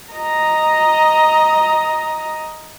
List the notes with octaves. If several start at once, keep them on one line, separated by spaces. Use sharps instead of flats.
D#5 A#5